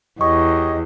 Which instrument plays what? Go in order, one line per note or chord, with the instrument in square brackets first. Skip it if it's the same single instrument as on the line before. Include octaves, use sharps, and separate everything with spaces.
[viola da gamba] E2 [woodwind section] G4 C#5 D#5 [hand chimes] C#6